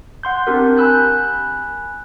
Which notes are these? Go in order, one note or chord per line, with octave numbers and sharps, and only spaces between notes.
F#5 C6 G6
C4 D4 G4 A#4
G#5 B5 E6 F#6 G6